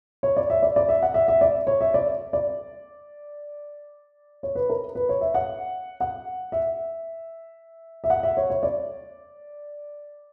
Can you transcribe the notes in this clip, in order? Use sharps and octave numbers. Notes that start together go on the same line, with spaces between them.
C#5
D5
E5
D5
D5
E5
F#5
E5
E5
D5
C#5
E5
D5
D5
C#5
B4
A#4
B4
C#5
E5
F#5
F#5
E5
E5
F#5
E5
C#5
C#5
D5